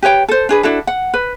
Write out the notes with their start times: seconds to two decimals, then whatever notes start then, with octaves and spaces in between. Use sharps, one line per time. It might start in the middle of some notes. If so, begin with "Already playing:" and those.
0.02 G4 B4 C#5 G5
0.28 A4 C5
0.49 D4 G#4 B4
0.63 D4 E4 F#4 A4
0.87 F#5
1.14 B4